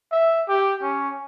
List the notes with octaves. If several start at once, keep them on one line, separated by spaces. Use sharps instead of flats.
E5
G4
C#4